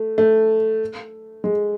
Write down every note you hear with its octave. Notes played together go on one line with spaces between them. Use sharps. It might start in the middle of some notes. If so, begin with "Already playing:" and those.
Already playing: A3
A3
G#3